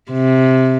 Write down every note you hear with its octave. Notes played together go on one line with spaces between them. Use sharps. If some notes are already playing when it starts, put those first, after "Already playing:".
C3